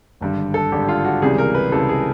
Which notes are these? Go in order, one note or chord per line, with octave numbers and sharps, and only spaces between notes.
G#1 G2 D3 G3
A4
G#1 G2 D3 G3 G4
F4
F#4
C#2 C3 E3 G3 G#4
A#4
B4
C#2 C3 E3 G3 A4
G#4